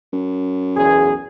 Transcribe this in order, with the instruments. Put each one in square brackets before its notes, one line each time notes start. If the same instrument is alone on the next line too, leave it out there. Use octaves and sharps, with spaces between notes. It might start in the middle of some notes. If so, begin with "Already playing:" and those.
[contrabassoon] F#2
[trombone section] B1 E2 G#4